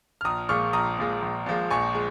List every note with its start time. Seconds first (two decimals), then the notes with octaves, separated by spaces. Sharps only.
0.21 F6
0.24 A#1 A#5 D#6
0.49 A#2 F3 G#3 C#6 F6
0.73 A#1 A#5 D#6
0.97 A#2 F3 G#3
1.22 A#1
1.46 A#2 F3 G#3
1.70 A#1 G#5 C#6
1.95 G#3